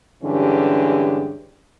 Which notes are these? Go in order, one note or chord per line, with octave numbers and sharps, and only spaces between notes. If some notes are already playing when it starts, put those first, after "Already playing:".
G2 D3 E3 G#3 C#4 G4